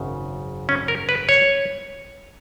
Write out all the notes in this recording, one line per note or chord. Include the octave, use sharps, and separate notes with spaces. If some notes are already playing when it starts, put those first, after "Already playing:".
Already playing: G#1 F#2 C#3
C#4
A#4
B4
C#5